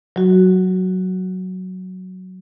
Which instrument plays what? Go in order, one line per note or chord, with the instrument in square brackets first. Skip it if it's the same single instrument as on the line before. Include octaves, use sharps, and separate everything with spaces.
[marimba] F#3 F#4